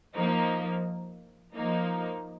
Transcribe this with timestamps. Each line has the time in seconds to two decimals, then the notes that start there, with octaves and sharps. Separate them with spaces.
0.15 F3 A#3 D#4
1.54 F3 A#3 D#4